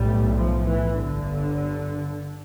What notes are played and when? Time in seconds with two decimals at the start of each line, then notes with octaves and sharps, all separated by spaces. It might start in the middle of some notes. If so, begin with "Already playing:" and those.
Already playing: B1 A2 G3
0.34 F3
0.65 E3
0.98 G1 G2 D3